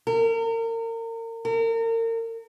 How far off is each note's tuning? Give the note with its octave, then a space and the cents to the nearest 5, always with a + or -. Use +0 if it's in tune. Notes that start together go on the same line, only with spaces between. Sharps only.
A#4 -35
A#4 -35